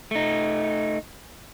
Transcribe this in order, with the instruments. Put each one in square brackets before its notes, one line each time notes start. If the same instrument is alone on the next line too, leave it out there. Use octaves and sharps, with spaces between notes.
[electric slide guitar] A3 D#4